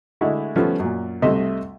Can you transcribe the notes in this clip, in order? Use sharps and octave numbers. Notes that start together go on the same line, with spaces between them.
D3 G#3 A3 E4 F#4
F3 G3 A3 B3 C#4
F#2 A#2
C2 C3 A3 D#5 E5 C6